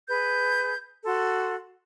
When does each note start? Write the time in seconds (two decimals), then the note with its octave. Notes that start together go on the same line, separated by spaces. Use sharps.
0.08 G#4 B4 G6
1.05 F#4 A4 C6